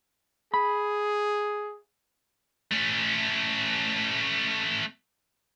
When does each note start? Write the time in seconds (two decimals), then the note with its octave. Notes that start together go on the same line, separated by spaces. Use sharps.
0.54 G#4 B5
2.71 A3 C#4